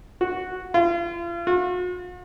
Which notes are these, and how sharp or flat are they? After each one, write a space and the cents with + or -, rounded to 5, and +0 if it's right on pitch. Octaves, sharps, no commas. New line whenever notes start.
F#4 -5
F4 -35
F#4 -45